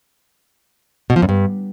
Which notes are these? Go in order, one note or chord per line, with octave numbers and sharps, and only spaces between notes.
B2
F3
F#2
G2